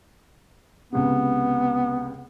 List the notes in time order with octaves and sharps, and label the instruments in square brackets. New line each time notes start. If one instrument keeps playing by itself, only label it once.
[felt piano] C#2 C3 [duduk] B3